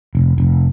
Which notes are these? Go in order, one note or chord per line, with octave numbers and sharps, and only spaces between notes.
F1
F1